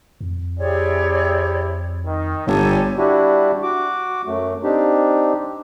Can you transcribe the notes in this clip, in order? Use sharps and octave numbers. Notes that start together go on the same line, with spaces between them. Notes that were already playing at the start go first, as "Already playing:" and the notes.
F2
C3 E4 G4 G#4 C#5 D5
D#3 D#4
G1 G2 G3 G4 A4 C#5 G#5
G3 D4 E4 F#4 G4
F#4 D6
F#2 F#3 A3
C4 D4 D#4 G4